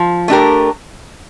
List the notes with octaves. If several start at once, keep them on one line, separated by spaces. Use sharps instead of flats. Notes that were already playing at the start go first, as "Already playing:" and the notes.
Already playing: F3
A3 D4 G4 A#4